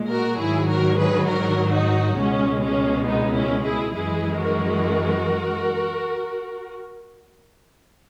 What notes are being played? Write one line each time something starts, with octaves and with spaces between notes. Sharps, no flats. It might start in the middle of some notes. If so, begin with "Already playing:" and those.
Already playing: A#2 G#3
F#4 A#4
G#2 D#3 F#3 E4 G#4
F#4 A#4
G#4 B4
F#4 A#4
D#4 F#4
C#2 B2 G#3 C#4
C#4
B3 D#4
C#4 E4
E4 G#4
F#2 E3 G#3 E4 G#4
F#4 A#4